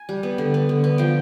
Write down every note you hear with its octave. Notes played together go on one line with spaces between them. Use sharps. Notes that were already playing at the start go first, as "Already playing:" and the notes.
Already playing: G#5
G3
B3
D3
B3
D3
B3
F3 G5